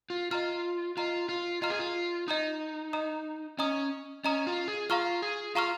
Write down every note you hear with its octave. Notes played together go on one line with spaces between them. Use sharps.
F4
F4 D#5 A#5 F6
F4 D#5 A#5 F6
F4
F4 D#5 A#5 F6
G#4
F4
D#4 D#5 A#5 D#6
D#5 A#5 D#6
C#4 D#5 A#5 D#6
C#4 D#5 A#5 D#6
F4
G#4
F4 F5 A#5 C#6 F6
G#4
F4 F5 A#5 C#6 F6